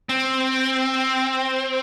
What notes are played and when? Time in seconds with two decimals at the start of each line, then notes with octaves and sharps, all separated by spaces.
0.09 C4